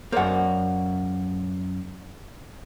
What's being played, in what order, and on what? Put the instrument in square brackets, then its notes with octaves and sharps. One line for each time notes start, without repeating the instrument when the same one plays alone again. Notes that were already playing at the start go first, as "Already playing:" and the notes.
[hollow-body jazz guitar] F#2 A#3 [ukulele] C5 D5 F#5